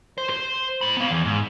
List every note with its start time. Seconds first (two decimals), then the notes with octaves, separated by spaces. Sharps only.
0.18 C5
0.30 C5
0.81 A2 B5
0.97 B3 F5
1.10 E2
1.25 G#2